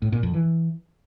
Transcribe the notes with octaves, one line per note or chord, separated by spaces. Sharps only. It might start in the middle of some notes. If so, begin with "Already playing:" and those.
A2
A#2
F2
E3